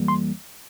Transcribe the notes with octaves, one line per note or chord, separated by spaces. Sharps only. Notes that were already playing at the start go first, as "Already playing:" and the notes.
Already playing: F2 E3 G3 A#3
C6